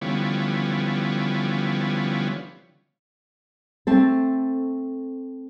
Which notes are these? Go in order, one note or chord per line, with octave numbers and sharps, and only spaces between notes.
D3 E3 F3 G3 B3 C#4
A3 C4 A4